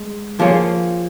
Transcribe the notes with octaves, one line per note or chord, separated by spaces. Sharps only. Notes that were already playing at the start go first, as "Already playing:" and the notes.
Already playing: G#3
F3 A#3 F4 G#4 C#5